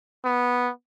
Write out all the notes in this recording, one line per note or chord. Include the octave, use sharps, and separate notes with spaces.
B3